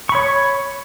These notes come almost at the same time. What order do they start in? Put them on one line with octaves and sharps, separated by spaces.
C#6 B5 C#5